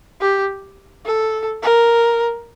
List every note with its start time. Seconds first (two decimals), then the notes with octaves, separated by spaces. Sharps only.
0.21 G4
1.05 A4
1.63 A#4